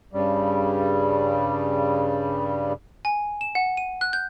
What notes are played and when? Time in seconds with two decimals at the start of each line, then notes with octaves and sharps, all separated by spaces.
0.13 G2 C#3 G3
3.05 G#5
3.41 E7
3.55 F#5
3.77 D#7
4.01 F#6
4.13 G6